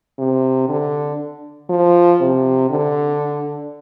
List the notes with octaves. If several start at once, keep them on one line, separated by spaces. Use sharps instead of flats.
C3
D3
F3
C3
D3